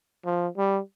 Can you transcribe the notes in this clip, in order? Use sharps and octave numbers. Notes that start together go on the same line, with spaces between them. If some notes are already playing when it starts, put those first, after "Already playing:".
F3
G3